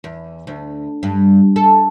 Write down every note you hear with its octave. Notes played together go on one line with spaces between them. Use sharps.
E2
D2
G2
A4